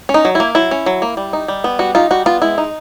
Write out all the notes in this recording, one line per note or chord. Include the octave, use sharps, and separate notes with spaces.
C#4
D#4
F#3
A#3 E4
F#3 E4
C#4
F#3
A#3
G3
D#4
G3
B3
G3 F#4
D#4 F4
G3 F#4
B3 F4
G#3 E4
D#4